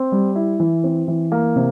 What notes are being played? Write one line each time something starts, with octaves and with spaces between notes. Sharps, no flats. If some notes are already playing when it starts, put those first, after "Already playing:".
Already playing: C4
G3
E4
E3
C4
E3
A#3
C3